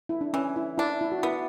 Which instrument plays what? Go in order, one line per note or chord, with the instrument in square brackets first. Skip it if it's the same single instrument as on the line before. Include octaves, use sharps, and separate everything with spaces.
[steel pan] E4
D4
[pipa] E3 [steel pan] C#4
[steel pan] E4
[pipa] D4 [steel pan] E4
[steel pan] E4
F#4
[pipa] B3 [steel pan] E4